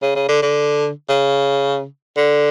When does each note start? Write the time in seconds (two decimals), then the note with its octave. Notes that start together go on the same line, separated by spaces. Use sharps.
0.02 C#3
0.15 C#3
0.29 D3
0.42 D3
1.09 C#3
2.17 D3